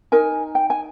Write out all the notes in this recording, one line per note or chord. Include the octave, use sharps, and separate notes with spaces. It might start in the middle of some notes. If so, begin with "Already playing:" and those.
D#4 A#4 G#5
G5
G#5